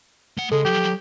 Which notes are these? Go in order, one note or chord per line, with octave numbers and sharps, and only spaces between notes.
A3 F#5
C#3 G#3 A4
F3 F#3 G4